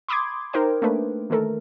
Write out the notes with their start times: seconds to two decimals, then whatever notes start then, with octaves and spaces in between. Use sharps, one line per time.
0.09 B5 C6 D6 D#6 G#6
0.53 D#4 A#4 C5 G5
0.82 A3 A#3 D4 B4
1.30 D#3 E3 A3 A4 A#4